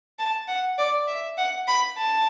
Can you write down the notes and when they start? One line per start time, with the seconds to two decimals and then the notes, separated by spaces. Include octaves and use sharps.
0.19 A5
0.48 F#5
0.78 D5
1.07 E5
1.37 F#5
1.67 B5
1.97 A5